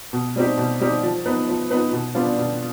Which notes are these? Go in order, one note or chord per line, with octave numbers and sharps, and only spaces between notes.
B2
G3 C4 D#4 G4
B2
G3 C4 D#4 G4
F3
B3 D#4 B4
F3
B3 D#4 B4
B2
G3 B3 D4 F4
B2